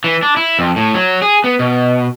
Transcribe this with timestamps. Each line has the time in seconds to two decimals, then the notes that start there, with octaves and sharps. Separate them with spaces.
0.04 E3
0.23 D4
0.37 E4
0.59 F2
0.76 A2
0.95 F#3
1.22 G#4
1.44 B3
1.59 B2